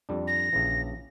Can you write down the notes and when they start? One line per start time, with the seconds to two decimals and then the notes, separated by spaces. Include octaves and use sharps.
0.09 F2 G3 D4
0.28 A#6
0.53 A#1 C#3 E3